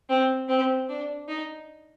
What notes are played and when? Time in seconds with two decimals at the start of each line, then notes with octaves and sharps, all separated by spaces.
0.09 C4
0.49 C4
0.89 D4
1.28 D#4